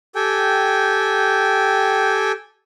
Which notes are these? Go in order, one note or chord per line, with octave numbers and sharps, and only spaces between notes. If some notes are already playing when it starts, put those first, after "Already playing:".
G4 A4 G5 G#5